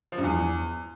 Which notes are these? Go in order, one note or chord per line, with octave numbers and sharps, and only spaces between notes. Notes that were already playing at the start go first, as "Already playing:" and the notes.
F3
G2
E2